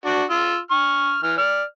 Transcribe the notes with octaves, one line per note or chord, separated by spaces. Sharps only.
D4 F#4 D5
F4 E6
C#6 F6
E3 F6
D5 F6